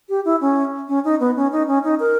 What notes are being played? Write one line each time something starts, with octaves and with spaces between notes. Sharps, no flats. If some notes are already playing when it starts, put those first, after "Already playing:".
G4
E4
C#4
C#4
D#4
B3
C#4
D#4
C#4
D#4
A#4